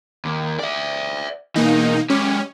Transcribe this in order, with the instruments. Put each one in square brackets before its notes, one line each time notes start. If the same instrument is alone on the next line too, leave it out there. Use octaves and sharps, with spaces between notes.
[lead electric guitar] D#2
D5 E5
[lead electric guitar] B2 E3 [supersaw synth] A#3 D#4
[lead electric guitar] G#3 G4 [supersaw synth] C#4